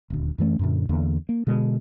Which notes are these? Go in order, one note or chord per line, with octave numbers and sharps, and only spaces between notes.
D#1 D2
F#2 E3 A3 C#4
F#2 A#2 D3
E2 D3 A#3
A#3
B2 D3 G#3